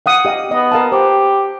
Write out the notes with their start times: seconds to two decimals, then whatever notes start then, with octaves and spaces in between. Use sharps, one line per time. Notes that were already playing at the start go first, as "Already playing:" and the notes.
0.06 F5 F#5 D#6
0.25 G4 D#5 F5
0.51 B3 D#5
0.72 A#4 F5 A5
0.92 G4 C5